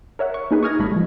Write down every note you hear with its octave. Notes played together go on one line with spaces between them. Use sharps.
A#4 C#5 E5 F#5
C#6
A#3 D#4 G#4 B4
C#6 D#6 F6 G#6 A#6
G1 G3 A3 A4 B5
F3 G#3